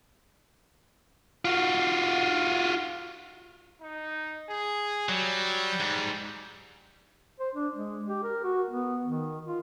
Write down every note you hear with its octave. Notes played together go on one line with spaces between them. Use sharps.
F4 F#4
D#4
G#4
F#3 G3
G#2
C5
D4
G#3
G4
A#4
F#4
B3
D#3
F4